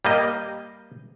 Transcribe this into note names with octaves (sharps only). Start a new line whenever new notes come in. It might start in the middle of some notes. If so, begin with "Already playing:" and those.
G3 A#3 D#5